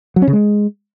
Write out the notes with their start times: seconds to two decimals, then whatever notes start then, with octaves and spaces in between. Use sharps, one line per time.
0.16 F#3
0.22 C#4
0.27 C#3
0.33 G#3